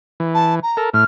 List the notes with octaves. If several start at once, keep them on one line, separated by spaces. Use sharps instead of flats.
E3
A5
A#5
A4 A#4
A2 F6